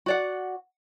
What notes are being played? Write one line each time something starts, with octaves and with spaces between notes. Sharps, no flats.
F#4 D5 F#5